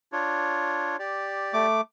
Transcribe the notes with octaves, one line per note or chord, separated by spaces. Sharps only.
D4 F4 C#5
G4 D5
A3 D6